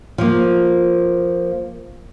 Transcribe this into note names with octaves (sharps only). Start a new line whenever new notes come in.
F3 A#3